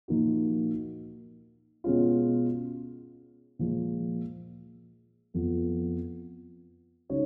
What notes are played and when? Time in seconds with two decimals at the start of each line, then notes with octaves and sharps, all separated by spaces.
0.08 A#2 F3 A#3 D#4 F#4
1.84 B2 G#3 C#4 F4
3.59 A#2 F3 G#3
5.34 F2 F3 B3 F4
7.09 C#3 G#3 D#4 F#4 C#5